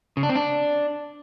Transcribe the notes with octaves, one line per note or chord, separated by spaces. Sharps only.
C#3
D4
C4
D4